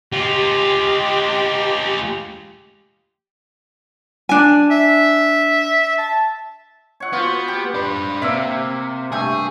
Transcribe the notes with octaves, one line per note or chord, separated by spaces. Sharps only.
G#3 F4 G4
D4 G#5
E5
A5
C#5 F#5
B3 F4 F#4 C5
G4
D4 B4
C3 A#3 E5
G2 A3 G#4 G5